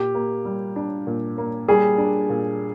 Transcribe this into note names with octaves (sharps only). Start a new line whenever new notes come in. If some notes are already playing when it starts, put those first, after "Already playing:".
Already playing: A#2 G4
A#3
G3
D4
A#2
A#3
G3 G#4
D4
A#2